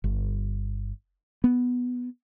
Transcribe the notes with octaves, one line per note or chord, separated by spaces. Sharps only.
G1
B3